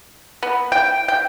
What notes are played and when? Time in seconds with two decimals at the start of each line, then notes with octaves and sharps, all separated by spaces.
0.43 B3
0.72 G5
1.08 G5